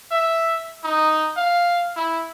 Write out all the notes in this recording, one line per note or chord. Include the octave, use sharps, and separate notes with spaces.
E5
D#4
F5
E4